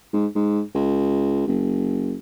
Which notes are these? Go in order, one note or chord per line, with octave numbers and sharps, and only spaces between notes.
G#2
G#2
C#2
F#1